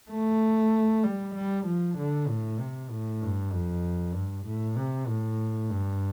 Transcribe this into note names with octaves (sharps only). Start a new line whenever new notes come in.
A3
G3
G3
F3
D3
A2
C3
A2
G2
F2
G2
A2
C3
A2
G2